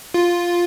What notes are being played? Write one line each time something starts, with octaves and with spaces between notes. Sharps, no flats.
F4